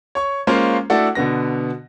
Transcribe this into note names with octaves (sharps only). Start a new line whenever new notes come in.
C#5 C#6
G#3 A#3 C#4 F4 C5
A3 D4 E4 F#4 A4
B2 D3 B3 A#6